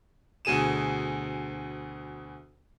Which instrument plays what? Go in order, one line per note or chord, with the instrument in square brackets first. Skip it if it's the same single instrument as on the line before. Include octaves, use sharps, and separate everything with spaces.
[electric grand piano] D2 B2 G#4 D#7 E7